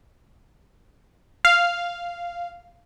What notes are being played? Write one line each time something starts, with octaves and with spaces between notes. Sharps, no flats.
F5